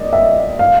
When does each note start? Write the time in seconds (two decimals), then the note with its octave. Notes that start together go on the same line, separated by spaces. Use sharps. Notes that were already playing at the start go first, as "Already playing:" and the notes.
Already playing: D5 D#5
0.13 E5
0.59 F5